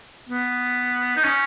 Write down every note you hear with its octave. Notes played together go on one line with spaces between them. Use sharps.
B3
D#4
C#4